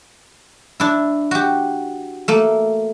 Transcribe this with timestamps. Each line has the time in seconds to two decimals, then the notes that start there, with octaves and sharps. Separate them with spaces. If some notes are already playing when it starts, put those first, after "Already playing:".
0.80 D4 E4
1.31 F#4 G4
2.28 A3 A#3